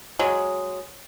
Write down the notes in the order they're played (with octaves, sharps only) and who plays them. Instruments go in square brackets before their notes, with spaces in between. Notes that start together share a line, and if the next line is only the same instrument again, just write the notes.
[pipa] F#3 G#3